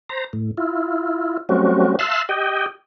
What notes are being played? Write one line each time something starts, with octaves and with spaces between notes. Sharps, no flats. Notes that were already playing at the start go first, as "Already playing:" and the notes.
C5 A#5
A2
E4 F4
F#3 G3 A3 C4 C#4 F#4
E5 F5 A5 C6 E6 F#6
G4 D#5 G5